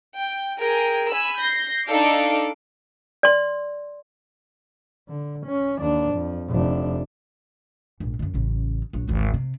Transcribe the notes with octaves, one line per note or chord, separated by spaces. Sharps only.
G5
G#4 A#4 G5 G#5
G#5 B5 E6
G6 A#6 C7
D4 D#4 A4 F5 D6
D5 C6
D3
C#4
D#2 D4
F2
F1 D4
A#1 G#2
F#2 D3
A1 C#3
A#1 F#3
G#1 D2
C3